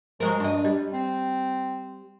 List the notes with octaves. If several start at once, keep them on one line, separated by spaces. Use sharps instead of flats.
F3 F#3 G#3 A#4
G2 D4 D#5
G3
C4